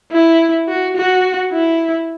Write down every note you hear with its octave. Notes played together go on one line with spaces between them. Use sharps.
E4
F#4
F#4
E4